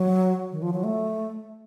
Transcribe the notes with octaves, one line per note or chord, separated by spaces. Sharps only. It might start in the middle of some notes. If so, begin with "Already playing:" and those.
Already playing: F#3
D#3
F3
F#3
A3